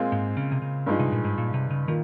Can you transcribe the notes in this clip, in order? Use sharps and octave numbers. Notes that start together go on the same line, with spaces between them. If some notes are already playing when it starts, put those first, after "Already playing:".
Already playing: A#2 G#3 C4 F4
G#2
C#3
C3
C#3
G2 F3 G#3 D#4
C3
A#2
G#2
A#2
C3
C#3
A#2 D#3